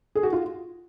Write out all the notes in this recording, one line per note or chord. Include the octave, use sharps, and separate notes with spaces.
G#4
F#4
F4